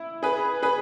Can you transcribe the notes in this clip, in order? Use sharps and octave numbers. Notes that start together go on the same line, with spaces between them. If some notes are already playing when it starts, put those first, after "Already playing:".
Already playing: E4
G#4 B4
G#4 B4